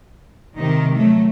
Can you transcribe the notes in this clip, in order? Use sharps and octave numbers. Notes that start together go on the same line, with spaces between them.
C3 D#3
F#3 A3